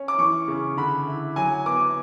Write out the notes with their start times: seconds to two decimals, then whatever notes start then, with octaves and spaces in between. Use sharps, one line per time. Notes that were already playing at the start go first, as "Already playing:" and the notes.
Already playing: C#4
0.08 D6
0.18 E3 C#6
0.48 C#3
0.77 D3 B5
1.07 E4
1.36 F#3 G#5
1.66 B3 D6